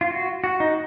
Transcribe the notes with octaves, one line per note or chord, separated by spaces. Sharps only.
F4
F#4
F#4
D#4